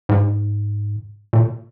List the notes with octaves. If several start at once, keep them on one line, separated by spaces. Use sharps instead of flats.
G#2
A#2